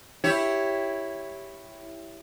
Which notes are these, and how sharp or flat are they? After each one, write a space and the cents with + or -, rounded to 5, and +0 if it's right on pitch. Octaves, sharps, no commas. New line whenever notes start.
E4 +0 G4 +0 C#5 +0